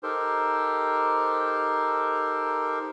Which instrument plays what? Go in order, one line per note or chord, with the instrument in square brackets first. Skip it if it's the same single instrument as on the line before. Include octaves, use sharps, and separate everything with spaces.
[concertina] D#4 G4 A4 A#4 C5